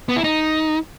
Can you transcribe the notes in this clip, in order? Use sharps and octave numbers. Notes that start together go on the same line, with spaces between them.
B3
E4
D#4